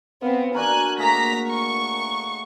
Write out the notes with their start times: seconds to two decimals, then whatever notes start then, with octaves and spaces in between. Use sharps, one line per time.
0.22 B3 C4 F5
0.55 D4 F#4 A#4 G#5 F#6
0.98 A3 A#3 G#4 A#5 B6
1.49 C#6